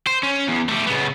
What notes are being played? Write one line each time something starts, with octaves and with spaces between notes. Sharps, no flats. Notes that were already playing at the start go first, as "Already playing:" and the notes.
C5
C#4
E2
A3 G4
C#3 B3